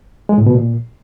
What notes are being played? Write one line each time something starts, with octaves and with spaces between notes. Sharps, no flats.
G#3
A2
B2
A#2